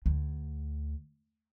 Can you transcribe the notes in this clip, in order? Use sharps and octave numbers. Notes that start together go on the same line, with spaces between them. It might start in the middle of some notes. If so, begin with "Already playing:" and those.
D2